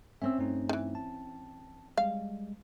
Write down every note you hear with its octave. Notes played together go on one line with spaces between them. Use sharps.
C4 C#4 E5 E6
G2 A3 D#4
D#3 E3
A5
G3 G#3 F5